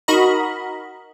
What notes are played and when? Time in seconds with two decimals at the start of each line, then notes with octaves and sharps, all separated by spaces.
0.08 D#4 F#4 A#4 D#5 B5